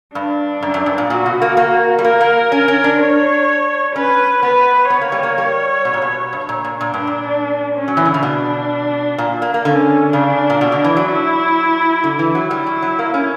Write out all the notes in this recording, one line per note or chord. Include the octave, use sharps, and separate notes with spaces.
G2 D4
F#2
F#2
G2
A#2
A#2 F#4
B2
A#3
A#3
G3
A#3 A#4
A#3
C#4
C#4
D4
C#5
C#4 B4
B3 B4
B3 C#5
A#3
G3
A#3
G3
B2
A#2
B2
G2
A#2
A#2
A#2 D4
G2
A#2
C#4
F#3
E3
D3
C#3
B2 D4
A#2
A#3
A#3
D3 C#4
C#3 D4
A#2
B2
D3
E3
F#3
E4
D3
E3
F#3
G3 E4
F#3
F#3
A#3
C#4